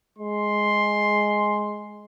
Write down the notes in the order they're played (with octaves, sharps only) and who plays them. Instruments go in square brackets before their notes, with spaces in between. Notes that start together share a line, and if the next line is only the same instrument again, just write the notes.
[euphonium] G#3 [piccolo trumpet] C6